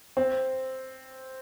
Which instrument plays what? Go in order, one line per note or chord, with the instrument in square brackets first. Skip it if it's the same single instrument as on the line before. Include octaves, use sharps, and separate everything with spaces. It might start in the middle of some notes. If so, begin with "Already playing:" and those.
[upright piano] C4